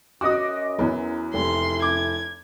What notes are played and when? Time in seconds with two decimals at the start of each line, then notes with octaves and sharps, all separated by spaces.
0.21 F#2 F#4 D#5 D6 D#6
0.79 E2 E3 F#3
1.34 F1 E4 C6
1.82 D6 G#6